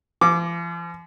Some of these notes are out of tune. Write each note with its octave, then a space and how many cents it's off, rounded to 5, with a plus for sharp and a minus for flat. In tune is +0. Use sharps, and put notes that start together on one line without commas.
F3 -45 D6 +0